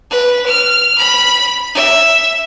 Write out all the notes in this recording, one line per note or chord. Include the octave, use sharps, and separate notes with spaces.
B4
F6
B5
E5